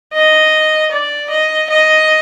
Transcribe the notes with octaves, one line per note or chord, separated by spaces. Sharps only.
D#5
D5
D#5
D#5